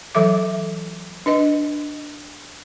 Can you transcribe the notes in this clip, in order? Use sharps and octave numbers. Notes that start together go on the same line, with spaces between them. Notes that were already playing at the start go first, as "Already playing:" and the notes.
E3 F#3 A4 E5 D6
D4 B4 D#5